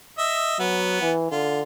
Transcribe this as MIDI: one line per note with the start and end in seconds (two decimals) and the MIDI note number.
0.18 0.58 75
0.18 0.58 76
0.59 0.97 54
0.59 1.11 59
1.02 1.27 52
1.31 1.61 50
1.31 1.61 65